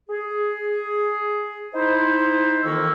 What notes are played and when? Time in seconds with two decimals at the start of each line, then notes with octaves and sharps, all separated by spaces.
0.10 G#4
1.74 D#4 E4 C5
2.64 F2 D#3 E3 A#3 C#6 E6